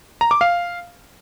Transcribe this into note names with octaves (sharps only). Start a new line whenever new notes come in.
A#5
D6
F5